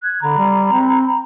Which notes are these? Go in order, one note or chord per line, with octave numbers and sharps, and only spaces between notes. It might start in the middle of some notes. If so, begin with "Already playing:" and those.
F#6 G#6
D3 A#5 B5
G3
C4